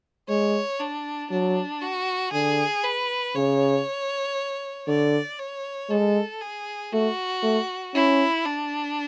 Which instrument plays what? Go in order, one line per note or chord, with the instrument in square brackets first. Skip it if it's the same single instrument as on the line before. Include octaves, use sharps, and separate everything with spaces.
[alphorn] G#3 [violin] C#5
[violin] D4
[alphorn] F#3 [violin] D4
[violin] F#4
[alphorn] D3 [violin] G#4
[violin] B4
[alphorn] C#3 [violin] C#5
[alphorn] D3 [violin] D5
[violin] C#5
[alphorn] G#3 [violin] A4
[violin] G#4
[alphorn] A3 [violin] F#4
[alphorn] A3
[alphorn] C#4 [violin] E4
[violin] D4